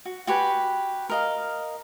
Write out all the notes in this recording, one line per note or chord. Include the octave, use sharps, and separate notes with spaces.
F#4
F#4 G4 B4 G#5
A#4 D#5 F5